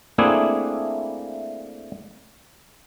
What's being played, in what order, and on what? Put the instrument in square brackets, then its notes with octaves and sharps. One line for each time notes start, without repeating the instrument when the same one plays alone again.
[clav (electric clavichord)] A3 A#3 C4 D4 E4 G#4